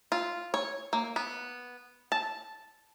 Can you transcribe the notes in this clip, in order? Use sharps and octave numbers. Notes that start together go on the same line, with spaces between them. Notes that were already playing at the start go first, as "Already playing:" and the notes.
F4
C#5
A#3
B3
A5